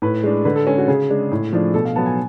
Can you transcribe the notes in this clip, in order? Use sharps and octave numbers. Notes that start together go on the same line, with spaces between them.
A2 B4
G#3 D4
D3 B4
A4
G#3 C#4 G#4
F#4
C#3 G#4
G#3 D4
A2
F3 A3 D4
B2 A4
F5
F#3 B3 A5
G#5